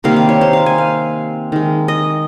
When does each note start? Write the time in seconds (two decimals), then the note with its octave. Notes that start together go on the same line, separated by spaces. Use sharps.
0.04 C3 D#3 G3 A#3 F5
0.16 F5
0.29 C#5
0.41 C5
0.53 F5
0.66 G#5
0.78 F5
1.52 D#3 G#3
1.88 D#5